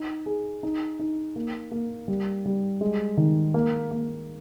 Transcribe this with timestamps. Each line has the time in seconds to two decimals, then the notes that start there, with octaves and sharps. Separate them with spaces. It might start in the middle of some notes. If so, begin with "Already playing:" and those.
Already playing: D#4
0.26 G#4
0.63 D#4
0.99 D#4
1.36 A#3
1.71 A#3
2.08 G3
2.45 G3
2.81 G#3
3.17 D#3
3.54 A#3
3.91 A#3